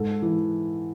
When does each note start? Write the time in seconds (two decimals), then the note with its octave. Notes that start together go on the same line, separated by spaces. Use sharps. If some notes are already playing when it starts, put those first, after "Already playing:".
Already playing: G#2 A4
0.22 E3